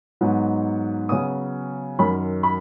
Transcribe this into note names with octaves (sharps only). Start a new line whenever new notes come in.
G#2 F#3 B3 D#4
C#3 F#3 B3 D#6
F#2 D#3 F#3 C#4 B5
B5